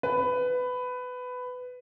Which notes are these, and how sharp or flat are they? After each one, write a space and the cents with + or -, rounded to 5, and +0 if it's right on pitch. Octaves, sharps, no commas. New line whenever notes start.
B4 +15